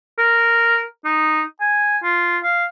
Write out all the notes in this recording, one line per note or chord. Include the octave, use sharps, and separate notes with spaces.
A#4
D#4
G#5
F4
F5